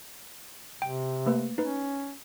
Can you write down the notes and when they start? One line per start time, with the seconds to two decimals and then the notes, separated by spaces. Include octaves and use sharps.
0.82 C3 G5
1.26 A3 A#3 B4
1.58 C#4 D#4 B4